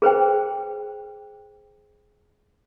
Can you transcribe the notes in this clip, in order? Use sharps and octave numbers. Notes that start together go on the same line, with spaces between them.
G#4 B4 C5 G5